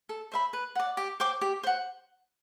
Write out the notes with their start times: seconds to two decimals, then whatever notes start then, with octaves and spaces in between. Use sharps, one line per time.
0.09 A4
0.32 C5 E5 B5
0.53 B4
0.75 D5 F#5
0.97 G4
1.20 C5 G5 D6
1.41 G4
1.63 C5 F#5